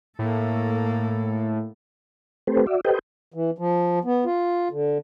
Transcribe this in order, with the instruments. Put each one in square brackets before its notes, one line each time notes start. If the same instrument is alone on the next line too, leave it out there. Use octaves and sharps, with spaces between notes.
[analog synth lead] A2 [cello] A#3 A4
[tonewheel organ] A3 C4 G4 A4 B4 C5
F#4 D5 E5
G4 A4 B4 C5 D#5 G5
[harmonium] E3
F3
B3
F4
D3